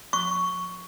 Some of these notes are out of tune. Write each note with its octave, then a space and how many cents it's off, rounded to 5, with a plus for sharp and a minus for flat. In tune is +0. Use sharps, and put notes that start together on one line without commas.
C#6 +10